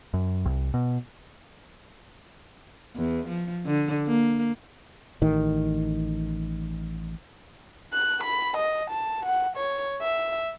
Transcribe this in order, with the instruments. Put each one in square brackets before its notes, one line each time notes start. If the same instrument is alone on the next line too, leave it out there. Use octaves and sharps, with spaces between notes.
[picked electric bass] F#2
C2
B2
[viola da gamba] E2
F3
D3
A#3
[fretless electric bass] A1 D#3
[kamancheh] F#6
B5
D#5
A5
F#5
C#5
E5